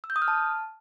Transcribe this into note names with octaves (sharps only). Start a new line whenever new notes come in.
E6
G6
D#6
F6
A5